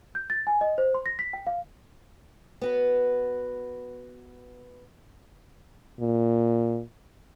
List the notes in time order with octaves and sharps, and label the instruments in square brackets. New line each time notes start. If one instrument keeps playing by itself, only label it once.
[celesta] G6
A6
G#5
D#5
C5
C6
A#6
B6
G5
F5
[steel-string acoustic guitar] B3 F#4 B4
[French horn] A#2